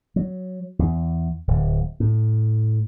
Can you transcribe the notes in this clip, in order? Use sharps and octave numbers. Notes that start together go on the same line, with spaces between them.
F#3
E2
D1
A2